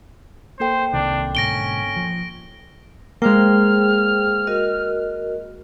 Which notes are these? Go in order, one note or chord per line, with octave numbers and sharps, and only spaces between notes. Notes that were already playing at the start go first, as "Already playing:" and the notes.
A#3 A4 C5 G5
C2 C3 D#3 D4
G#2 B2 D3 C#4 A#6 D7 G7
F3
G#3 A#3 G#4 C5 G5 F6
F#4 A#4 D#5